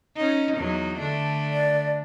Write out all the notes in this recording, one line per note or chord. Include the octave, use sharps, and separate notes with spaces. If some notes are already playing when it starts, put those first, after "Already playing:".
C#4 D#4
E2 F#3 D#4
D3 A3 D4
D5